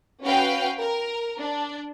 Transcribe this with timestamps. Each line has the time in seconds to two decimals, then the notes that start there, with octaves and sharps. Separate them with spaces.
0.24 C#4 F#4 B4 F5 G5
0.79 A#4
1.40 D4